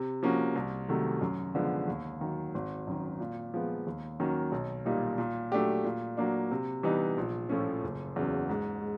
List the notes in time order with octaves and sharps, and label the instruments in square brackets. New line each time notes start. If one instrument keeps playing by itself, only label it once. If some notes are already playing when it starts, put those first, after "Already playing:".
Already playing: [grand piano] C3
F3 A#3 C#4 F#4
C2
C3 D#3 F#3 A3
F#2
D3 F3 G#3 B3
D#2
D#3 F#3
G#1
F#2 D#3
A#2
F3 G#3 B3
D#2
D#3 F#3 A#3 C#4
B1
A#2 G3 A#3 D#4
A#2
F#3 A3 D4 G4
A#2
F#3 A#3 D4
C3
E3 G3 B3 D#4
A#1
A2 F3 A3 C#4
F#1
E2 C#3 F#3
G#2
G#3